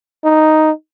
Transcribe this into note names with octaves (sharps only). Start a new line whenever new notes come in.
D#4